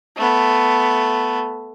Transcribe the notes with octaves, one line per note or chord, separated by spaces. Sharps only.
A3 B3